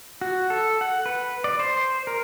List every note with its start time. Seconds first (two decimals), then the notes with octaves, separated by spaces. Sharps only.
0.21 F#4
0.50 A4
0.81 F#5
1.06 B4
1.44 D5
1.60 C5
2.07 A#4